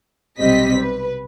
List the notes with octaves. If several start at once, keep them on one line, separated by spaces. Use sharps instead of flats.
B1 C3 G3 C4 D#5 B6
B4